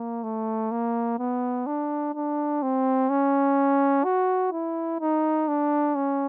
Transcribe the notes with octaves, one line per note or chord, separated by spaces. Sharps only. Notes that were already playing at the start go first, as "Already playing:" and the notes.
Already playing: A#3
A3
A#3
B3
D4
D4
C4
C#4
F#4
E4
D#4
D4
C#4